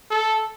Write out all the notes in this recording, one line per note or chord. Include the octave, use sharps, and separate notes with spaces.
A4